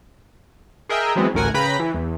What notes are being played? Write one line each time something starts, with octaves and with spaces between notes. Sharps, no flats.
G#4 A#4 D#5 E5 G5
E3 F#3 G#3 B3 C4
A1 D2 A2 A#4 F#5 G#5
C#3 B4 G5 A#5 B5 B6
E3
E2